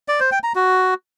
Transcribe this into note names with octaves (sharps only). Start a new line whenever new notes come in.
D5
C5
G5
A#5
F#4